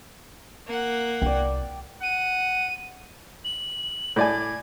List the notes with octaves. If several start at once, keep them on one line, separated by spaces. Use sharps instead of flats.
A#3 F#5
C2 D5 G5
F#5 D#7
F#7
A2 D5 G#5 G#6